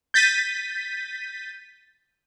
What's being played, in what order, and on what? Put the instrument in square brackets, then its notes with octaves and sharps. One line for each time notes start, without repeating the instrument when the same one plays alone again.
[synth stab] G6 A6 B6 D#7